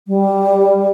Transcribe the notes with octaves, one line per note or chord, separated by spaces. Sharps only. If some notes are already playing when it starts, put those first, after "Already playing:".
G3